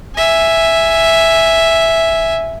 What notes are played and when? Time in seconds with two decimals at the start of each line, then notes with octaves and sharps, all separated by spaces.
0.16 E5 G#5